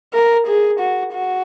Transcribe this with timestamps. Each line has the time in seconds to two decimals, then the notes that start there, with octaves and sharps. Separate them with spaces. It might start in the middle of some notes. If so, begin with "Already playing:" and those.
0.13 A#4
0.47 G#4
0.80 F#4
1.13 F#4